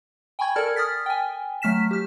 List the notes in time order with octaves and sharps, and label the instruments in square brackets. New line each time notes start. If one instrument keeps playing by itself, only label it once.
[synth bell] G5 G#5 B5 C#6 G#6
A4 A#4 D5 A5 F6 G#6
D#6 F6 A6 B6
G5 G#5
F#3 A3 F6 B6 E7
G4 F6